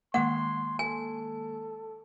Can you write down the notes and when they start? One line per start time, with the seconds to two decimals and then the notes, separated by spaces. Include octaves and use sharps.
0.14 D#3 G#3 A#3 F#5 C6
0.79 A4 G#5